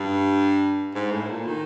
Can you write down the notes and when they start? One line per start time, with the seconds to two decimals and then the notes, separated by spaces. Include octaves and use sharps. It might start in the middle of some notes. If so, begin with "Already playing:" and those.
Already playing: G2
0.94 G#2
1.12 A2
1.30 A#2
1.47 D#3